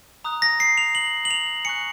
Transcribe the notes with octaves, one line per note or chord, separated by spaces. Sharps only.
A#5 D#6 F#6
A#6
C7
F7
F#7
F#7
F7
G#5 C#6 F#6 C#7